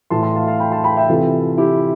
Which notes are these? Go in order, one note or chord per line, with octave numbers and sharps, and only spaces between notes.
A2 E3 A5 C6
A5 C6
F5 A5
F5 A5
G5 B5
A5 C6
G5 B5
E5 G5
C3 E3 F4 A4
E4 G4